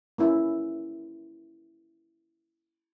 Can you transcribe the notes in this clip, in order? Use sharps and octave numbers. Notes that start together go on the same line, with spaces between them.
A#3 C#4 E4